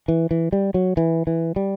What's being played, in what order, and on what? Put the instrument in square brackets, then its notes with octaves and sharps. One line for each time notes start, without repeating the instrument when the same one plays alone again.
[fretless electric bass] E3
E3
G3
F#3
E3
E3
G3